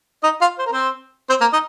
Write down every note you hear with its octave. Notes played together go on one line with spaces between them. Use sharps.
D#4 D#5
F4 F5
C5
A#4
C4 C5
C4 C5
A#3 A#4
D#4 D#5